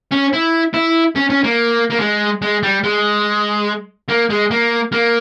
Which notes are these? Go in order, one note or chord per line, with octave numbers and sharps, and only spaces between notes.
C#4
E4
E4
C#4
C#4
A#3
A#3
G#3
G#3
G3
G#3
A#3
G#3
A#3
A#3